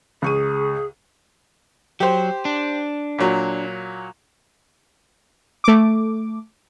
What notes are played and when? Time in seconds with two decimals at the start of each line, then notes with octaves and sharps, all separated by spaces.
0.22 C#2 G#4 C#6 D#7
2.00 F#3 G4 C5
2.45 D4
3.18 A#2 F#3
5.64 A3 D6